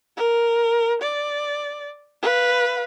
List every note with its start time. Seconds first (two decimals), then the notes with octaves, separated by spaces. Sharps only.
0.17 A#4
1.01 D5
2.22 B4 F5